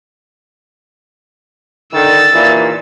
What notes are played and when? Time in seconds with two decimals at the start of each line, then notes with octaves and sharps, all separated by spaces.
1.93 D3 D#3 E6 A6
2.33 D#2 A#2 E3